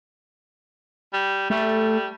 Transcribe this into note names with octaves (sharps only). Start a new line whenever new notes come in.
G3
G3 A3